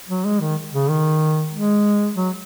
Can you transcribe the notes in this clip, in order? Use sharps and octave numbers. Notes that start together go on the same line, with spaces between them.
F#3
G#3
D#3
C#3
D#3
G#3
F#3